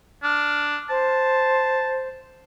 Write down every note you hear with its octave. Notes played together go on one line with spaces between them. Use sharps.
D4 F6
C5 A5